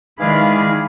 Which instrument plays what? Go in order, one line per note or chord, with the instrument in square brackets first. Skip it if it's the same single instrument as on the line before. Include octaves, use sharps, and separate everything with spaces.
[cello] D#3 [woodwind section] E3 G#3 F5 [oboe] G#4 [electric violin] D5 B5